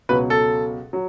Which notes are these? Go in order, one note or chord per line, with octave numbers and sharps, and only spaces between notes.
C#2 B2 F#3 B4
A4
F#3